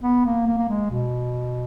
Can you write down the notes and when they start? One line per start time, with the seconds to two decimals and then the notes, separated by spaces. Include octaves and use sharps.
0.03 B3
0.25 A#3
0.47 A#3
0.58 A#3
0.69 G#3
0.90 B2